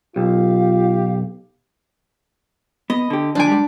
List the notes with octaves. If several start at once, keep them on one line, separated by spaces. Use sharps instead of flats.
B1 F4 G4 F5
B3 D#5
D3 G4
D2 F3 D4 G#5 D6
G3 G#3 G4